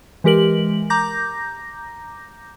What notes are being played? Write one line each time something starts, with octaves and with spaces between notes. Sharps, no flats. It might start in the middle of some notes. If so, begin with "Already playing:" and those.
E3 G#3 G4 A#4 F#7
A#5 D6 G6 A#6